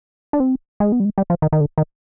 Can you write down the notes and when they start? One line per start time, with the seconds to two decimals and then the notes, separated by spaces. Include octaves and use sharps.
0.33 D4
0.40 C4
0.80 G#3
0.92 B3
1.00 G3
1.05 G#3
1.18 G3
1.30 F3
1.42 D#3
1.53 D#3
1.61 D3
1.78 D#3